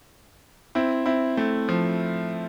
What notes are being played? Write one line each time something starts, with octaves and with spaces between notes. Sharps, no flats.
C4 E4
C4 E4
A3 C4
F3